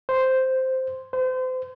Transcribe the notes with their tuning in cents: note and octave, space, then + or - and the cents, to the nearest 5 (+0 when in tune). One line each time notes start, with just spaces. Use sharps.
C5 -5
C5 -35